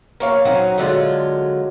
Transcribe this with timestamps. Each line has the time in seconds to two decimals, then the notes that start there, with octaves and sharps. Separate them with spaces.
0.20 A#3 C#5 F5
0.45 F#3 C4 C#4 D#4
0.78 D3 F#3 G#3 F4